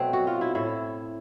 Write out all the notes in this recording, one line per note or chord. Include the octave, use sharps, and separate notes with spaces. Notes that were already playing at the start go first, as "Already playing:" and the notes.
Already playing: B2 F#3 A3 C4
F#4
F4
E4
A2 E4